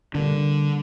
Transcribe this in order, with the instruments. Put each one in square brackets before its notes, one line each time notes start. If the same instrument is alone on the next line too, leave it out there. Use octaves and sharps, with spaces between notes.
[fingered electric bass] D3 [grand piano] G3 A#3 D4